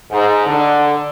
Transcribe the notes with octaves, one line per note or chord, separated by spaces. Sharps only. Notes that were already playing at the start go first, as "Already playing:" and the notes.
G#2
D3